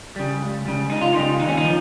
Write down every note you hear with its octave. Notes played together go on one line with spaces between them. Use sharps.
C#3 G3
C#2
C#3 G3
C#2 D#4
F4
C#3 G3 D#4
D#2 D#4
C#4
D#4
F3